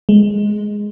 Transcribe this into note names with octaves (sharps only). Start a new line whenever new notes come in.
G#3